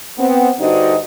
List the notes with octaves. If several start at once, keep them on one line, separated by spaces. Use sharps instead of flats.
B3 C4
G2 D3 D#4 F#4 C5 D#5